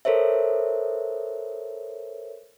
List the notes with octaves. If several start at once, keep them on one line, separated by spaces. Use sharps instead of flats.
A4 A#4 C5 C#5 E5